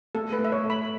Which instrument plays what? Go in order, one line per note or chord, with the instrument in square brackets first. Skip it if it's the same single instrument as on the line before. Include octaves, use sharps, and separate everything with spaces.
[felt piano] A3 [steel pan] A4
[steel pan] B4
[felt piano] A3
[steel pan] E5
C#5
[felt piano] A4
[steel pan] B5